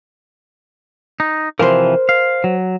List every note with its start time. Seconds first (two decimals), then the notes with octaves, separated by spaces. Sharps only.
1.20 D#4
1.59 C3 E3 F3 A#4 C5
2.09 F5
2.44 F#3